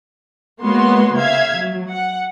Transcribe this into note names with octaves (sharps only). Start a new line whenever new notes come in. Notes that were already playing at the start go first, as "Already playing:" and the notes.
G#3 A#3 B3 F#4 C#5 C6
C#3 E5 F5 G#6
F#3
F#5